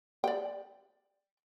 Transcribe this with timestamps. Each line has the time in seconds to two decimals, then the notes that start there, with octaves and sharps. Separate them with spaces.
0.24 D5 G5